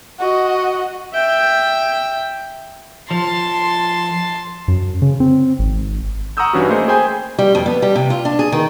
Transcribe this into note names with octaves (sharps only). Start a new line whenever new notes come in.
F#4 D#5
E5 G5
F3 A5 C6
F#2
C#3
C4
G#1
F#5 A#5 C#6 D#6 E6 G6
G2 E3 C#4 D#4 E4 F#4
A3 A#3 G#4 C5 D#5
G#4 C5 G5 G#5 B5 G6
G3
F2
B3
G3
C3
F4
D4
G#4
D#3